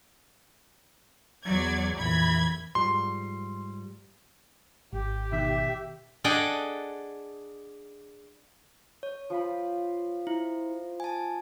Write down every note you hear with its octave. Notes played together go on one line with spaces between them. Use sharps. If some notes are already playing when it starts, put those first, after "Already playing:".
E2 F#3 D5 G#6
A#1 F2 E3 B5 G#6
G#2 F3 G3 C6
G#1 G4
B2 D#3 E5
D4 G#4 A4 D#5 F#5 G5
C#5
F3 F4 B5
E4
G#5 A5